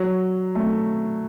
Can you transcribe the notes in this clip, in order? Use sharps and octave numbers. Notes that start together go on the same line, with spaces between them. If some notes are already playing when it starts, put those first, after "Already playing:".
Already playing: F#3
A3